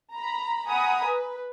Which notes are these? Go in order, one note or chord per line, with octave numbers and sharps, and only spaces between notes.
A#5 B5
F#5 G#5 A#5 B5 D#6
B4